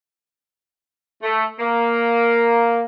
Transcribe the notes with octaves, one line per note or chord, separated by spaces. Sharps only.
A3
A#3